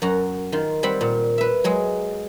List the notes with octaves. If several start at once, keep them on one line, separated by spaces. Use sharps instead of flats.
F#2 F#4 A#5
D#3 F4 C6
G3 C4 F#5 B5
A#2
B4 E5
F#3 G#3 G#4